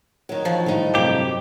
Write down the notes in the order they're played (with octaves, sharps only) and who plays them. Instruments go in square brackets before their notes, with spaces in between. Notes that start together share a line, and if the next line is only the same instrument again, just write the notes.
[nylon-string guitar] D#3 F#3
[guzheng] F3
[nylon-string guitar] A2 D#4 [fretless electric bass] D#3 F#3 G3
[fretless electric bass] G2 C3 F#3 [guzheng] A#3 [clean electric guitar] G4